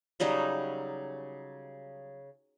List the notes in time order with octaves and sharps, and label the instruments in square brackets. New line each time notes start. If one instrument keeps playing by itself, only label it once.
[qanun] C#3 F#3 G3 D#4